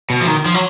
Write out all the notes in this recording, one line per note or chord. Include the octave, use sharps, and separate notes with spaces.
B2
F3
D#3
F3
F#3